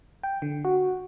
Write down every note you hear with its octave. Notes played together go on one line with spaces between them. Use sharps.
G5
D3
F#4